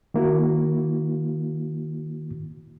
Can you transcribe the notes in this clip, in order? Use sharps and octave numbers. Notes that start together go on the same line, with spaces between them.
D#3 A#3 E4 F#4